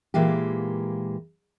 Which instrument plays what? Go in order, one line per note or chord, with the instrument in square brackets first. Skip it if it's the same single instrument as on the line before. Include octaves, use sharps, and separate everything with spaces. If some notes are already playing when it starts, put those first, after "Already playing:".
[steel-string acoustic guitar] A#2 E3 G#3 A#3 G4